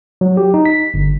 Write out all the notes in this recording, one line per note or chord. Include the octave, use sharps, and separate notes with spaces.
F#3
G4
D#4
B6
G1